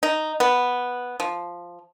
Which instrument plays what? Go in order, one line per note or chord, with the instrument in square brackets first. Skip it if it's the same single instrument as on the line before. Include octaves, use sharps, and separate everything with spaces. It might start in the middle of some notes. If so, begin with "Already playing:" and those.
[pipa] D#4
B3
F3